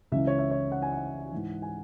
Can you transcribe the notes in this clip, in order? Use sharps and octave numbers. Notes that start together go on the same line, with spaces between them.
C#2 C#3 E3 E5
C#5
E5
C#5
F#5
G#5
F#5
G#2 E3
G#5